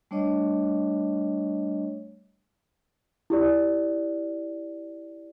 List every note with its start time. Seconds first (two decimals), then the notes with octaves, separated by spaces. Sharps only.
0.11 G3 A3 D4 C#5 D#5
3.30 E4 G4 D5